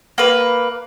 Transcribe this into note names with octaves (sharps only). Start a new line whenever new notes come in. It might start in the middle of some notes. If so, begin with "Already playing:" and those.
A#3 B4